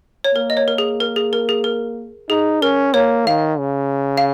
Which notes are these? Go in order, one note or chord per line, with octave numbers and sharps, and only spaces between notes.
C#5
A#3 A#4
D#5
C#5
A#4
G#4
A#4
G#4
A#4
G#4
A#4
D#4 G#4
C#4 A#4
A#3 C#5
D#3 F5
C#3
F5